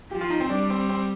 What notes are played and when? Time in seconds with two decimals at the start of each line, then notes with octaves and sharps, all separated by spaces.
0.11 F3 G4
0.21 F4
0.30 D#4
0.40 C4
0.50 G3 D4
0.70 C4
0.89 C4